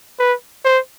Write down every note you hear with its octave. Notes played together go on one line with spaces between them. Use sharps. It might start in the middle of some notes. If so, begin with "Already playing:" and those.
B4
C5